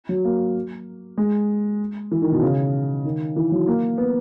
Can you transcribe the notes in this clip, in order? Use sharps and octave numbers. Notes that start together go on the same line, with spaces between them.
F#3
A#3
G#3
E3
D#3
B2
C#3
D#3
E3
F#3
A#3
B3